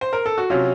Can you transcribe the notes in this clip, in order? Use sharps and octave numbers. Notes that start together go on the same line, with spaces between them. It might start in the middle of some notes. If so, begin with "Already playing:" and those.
C5
A#4
A4
F#4
C3 F#3 C#4 F4